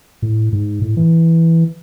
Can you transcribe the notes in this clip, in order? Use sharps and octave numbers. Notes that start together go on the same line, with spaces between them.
A2
G#2
A2
E3